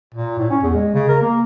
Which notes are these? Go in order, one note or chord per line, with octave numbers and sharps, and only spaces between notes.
A#2
A2
C#4
E2
G#3
C#3
A#4
A#3